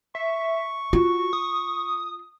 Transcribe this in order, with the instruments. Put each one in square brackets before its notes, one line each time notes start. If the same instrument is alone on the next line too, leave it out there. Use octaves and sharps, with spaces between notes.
[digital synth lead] E5 [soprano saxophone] C#6
[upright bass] F4 [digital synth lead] F#4
[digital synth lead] D#6